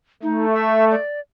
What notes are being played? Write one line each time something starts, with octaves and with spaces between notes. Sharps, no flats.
A3 D#4
E5
D5